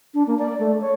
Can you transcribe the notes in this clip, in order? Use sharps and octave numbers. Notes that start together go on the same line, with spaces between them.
D4
A#3
D5
A3
C#5